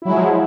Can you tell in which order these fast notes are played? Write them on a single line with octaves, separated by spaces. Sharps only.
E4 F#3 G#3 F3